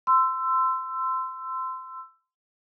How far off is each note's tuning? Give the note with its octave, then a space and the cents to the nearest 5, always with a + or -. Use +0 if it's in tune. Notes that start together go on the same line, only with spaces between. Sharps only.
C6 -20 E6 +15